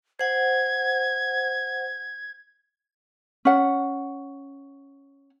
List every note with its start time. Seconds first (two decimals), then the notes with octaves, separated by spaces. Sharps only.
0.19 C5 F#5 G#6
3.45 C#4 F#5